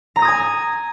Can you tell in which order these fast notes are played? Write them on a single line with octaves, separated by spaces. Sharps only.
A#5 A#6 D#6 G#6 G#5